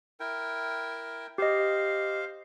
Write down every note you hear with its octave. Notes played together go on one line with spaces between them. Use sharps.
E4 A#4 G5
G4 C5 D#5 F5